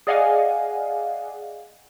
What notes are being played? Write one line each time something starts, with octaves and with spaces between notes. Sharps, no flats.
G#4 D5 D#5 F5 F#5 G#5